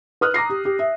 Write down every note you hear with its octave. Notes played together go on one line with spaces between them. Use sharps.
B4 D#6 F6 F#6
A#5 D6 A#6 C7
G4
G4
E5